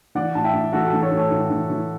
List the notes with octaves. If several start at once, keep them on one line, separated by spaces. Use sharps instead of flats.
E3 D5 F#5
A2 A5
E5 G5
A2
E3 F#4 A4
F#4 A4
E3
A4 C#5
A2
A4 C#5
A2
E3
E3